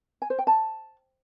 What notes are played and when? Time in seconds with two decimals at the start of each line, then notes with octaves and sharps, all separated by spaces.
0.22 G#5
0.30 C5
0.39 G5
0.47 A5